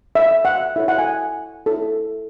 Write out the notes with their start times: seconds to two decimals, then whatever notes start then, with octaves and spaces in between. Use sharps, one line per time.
0.15 E5
0.45 F#5
0.76 E4 A4 C#5 E5
0.88 F#5
0.98 G#5
1.66 E4 A4 C#5